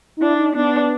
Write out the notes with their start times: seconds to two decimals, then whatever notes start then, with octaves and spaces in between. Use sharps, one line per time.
0.17 D#4
0.22 D4 E4
0.39 D#4
0.55 B3 D4